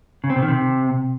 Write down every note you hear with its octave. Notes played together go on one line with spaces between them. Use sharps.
C#3
C4
C3
D#3
C3